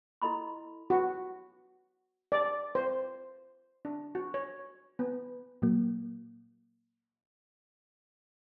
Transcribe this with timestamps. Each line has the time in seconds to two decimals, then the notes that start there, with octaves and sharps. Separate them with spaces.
0.22 E4 A4 D#5 B5 C6
0.90 F#4
2.32 D5
2.75 C5
3.85 D4
4.15 F#4
4.34 C#5
4.99 B3
5.62 A#2 F#3 A#3